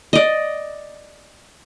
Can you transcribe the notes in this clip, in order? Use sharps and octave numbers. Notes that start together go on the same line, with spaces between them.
D5 D#5